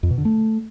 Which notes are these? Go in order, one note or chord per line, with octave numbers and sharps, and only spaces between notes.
F2
B2
D3
A3